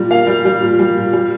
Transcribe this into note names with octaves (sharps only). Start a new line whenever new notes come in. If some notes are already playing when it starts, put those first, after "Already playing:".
Already playing: A#2 G3
A#3 F5
G3
G3
A#2
G3
A#2
G3